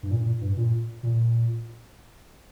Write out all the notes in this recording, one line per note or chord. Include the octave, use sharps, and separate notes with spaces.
G2
A#2
A#2
G2
A#2
A#2